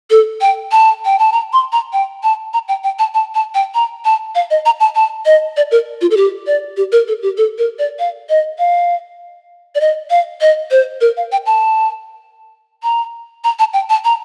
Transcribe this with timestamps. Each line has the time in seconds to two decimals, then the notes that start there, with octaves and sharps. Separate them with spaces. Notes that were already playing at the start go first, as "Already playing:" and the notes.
0.10 A4
0.41 G5
0.72 A5
1.05 G5
1.19 A5
1.32 A#5
1.53 C6
1.72 A#5
1.93 G5
2.23 A5
2.53 A#5
2.68 G5
2.84 G5
2.99 A5
3.14 A5
3.35 A5
3.54 G5
3.75 A#5
4.05 A5
4.35 F5
4.50 D#5
4.66 A#5
4.80 A5
4.95 A5
5.26 D#5
5.57 D5
5.71 A#4
6.01 F4
6.11 A4
6.17 G4
6.47 D5
6.77 G4
6.92 A#4
7.08 A4
7.22 G4
7.37 A4
7.58 A#4
7.79 D5
7.99 F5
8.29 D#5
8.59 F5
9.75 D5
9.81 D#5
10.10 F5
10.41 D#5
10.71 C5
11.01 A#4
11.17 F5
11.32 G5
11.46 A5
12.83 A#5
13.44 A#5
13.59 A5
13.73 G5
13.90 A5
14.05 A#5